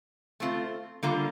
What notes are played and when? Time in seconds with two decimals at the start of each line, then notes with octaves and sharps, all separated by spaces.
0.40 A3 C4 F4
1.03 D3 G3 A#3 F4